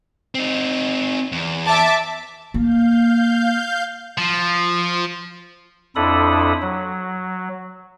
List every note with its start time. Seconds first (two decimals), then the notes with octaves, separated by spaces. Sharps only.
0.35 C4 D#4
1.32 E2
1.67 E5 A5 D6
2.54 A#3 F5 G6
4.18 F3
5.96 F2 D4 E4 A4 B5 D#6
6.62 F#3